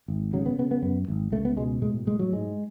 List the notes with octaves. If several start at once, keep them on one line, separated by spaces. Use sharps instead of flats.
G#1
C#3 F#3
B3
C#3 B3
B3
F#2 B3
G#1
C#2 A3
B3
B2 G#3
A2 G#3
A2 G#3
F#3
G#2 G#3